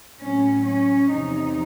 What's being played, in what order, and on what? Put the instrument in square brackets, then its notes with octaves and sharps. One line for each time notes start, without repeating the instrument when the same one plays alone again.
[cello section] A2 F#3 C#4
C#4
E2 C3 F3 D#4